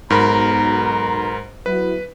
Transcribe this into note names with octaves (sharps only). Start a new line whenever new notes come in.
B1 G#2 B3 A#4 A#5 B5
F#3 B3 E4 B4